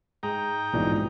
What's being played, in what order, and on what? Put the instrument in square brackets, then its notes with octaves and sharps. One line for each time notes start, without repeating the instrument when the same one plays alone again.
[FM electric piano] G#2 G#3 [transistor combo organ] D#4 G5 A#5
[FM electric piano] A#1 F2 [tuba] G#2 [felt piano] B2 E3 D5